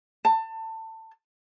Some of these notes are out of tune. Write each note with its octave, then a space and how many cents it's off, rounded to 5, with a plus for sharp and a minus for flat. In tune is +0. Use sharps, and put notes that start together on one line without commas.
A5 +25